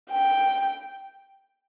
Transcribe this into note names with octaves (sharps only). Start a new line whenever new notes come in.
G5